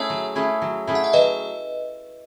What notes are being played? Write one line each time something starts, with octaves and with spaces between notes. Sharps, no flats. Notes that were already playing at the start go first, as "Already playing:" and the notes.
Already playing: A3 C#4 E4 G#4 C#5 E5
F#3
A3 C#4 E4 G#4
F#3
A3 C#4 E4 G#4
F#5
E5
F#3 B4 D#5